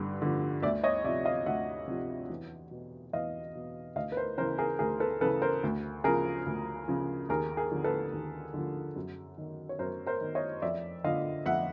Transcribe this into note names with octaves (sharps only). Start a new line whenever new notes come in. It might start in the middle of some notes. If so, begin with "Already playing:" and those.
Already playing: G2 D3
D3 F3
D2 D5 E5
C#5 D#5
C3 F3 D5 E5
D#5 F5
D2 E5 F#5
C3 F3
E2
B2
E2 D#5 F5
B2
D2 D#5 F5
B4
A#4 C5
C#3 E3 A#4 C5
G#4 A#4
D2 G#4 A#4
A4 B4
C#3 E3 A4 B4
A#4 C5
D2
C#3 F3 G#4 A#4
D2
C#3 F3
D#2 G#4 A#4
G#4 A#4
D3 F3
A4 B4
D#2
D3 F3
F#2
D#3
C#5
F#2 A#4 C5
A#4 C5
D#3
C#5 D#5
F2 D5 E5
D3 F3 D#5 F5
F2 E5 F#5